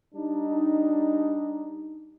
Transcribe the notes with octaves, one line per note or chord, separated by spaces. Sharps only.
G3 D4 D#4